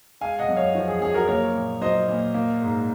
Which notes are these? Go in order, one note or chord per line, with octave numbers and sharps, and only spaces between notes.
G#3 F5 G#5
D#5 F#5
F#2
C#5 F5
F3
G#4
F#2 G#4
F#4 A#4
A#3 A#4 C#5
A#2
F#3 C5 D#5
A#2
A#3
G#2